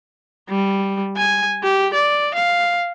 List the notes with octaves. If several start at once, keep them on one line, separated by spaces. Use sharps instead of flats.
G3
G#5
G4
D5
F5